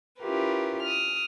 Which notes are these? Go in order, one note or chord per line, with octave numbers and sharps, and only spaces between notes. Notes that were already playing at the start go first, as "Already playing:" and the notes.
C#4 E4 F4 G4 A#4 B4
D#6 F6